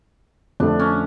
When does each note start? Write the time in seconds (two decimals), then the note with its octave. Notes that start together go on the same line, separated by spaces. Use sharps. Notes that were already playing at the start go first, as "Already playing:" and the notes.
0.60 F2 D3 A3 D4
0.79 C#4